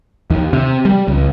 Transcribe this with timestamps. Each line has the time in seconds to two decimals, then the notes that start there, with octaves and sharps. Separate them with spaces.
0.30 D#2
0.53 C3
0.85 G3
1.08 C#2